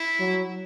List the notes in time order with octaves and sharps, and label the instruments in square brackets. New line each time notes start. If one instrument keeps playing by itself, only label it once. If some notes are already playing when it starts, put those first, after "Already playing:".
Already playing: [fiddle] E4
[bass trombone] F#3